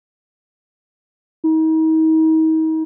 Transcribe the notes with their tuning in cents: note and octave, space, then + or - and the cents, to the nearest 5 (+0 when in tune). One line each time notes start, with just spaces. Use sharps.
D#4 +40